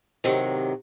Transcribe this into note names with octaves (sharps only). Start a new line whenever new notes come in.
A2 C3 D#3 F#3